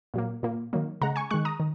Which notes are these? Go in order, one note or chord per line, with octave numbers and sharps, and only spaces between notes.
A#2 F#3 A#3
A#2 A#3
D#3 F#3 A#3
C#3 G#3 F#5 A#5
G#5 C#6
D#3 G#3 C#6 F#6
A#5 D#6
D#3